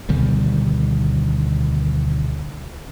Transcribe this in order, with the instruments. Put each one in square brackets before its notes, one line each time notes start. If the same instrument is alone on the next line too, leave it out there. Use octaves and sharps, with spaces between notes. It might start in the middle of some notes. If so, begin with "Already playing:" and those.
[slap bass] D2 B2 D#3 G3